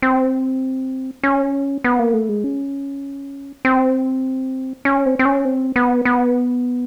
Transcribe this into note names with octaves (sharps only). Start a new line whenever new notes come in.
C4
C#4
B3
A#3
A3
G#3
C#4
C4
C#4
C4
C4
C#4
C4
B3
B3